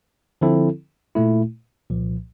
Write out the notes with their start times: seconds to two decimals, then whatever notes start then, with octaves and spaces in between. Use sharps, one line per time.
0.41 D3 F3 C4 E4 A4
1.15 A#2 A3 E4
1.90 C2 A#2 F3